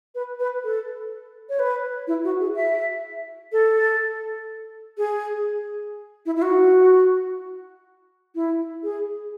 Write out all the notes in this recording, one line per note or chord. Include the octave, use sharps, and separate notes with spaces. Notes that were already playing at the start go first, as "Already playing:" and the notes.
B4
B4
A4
C#5
B4
E4
F#4
G#4
E5
A4
G#4
E4
E4
F#4
E4
G#4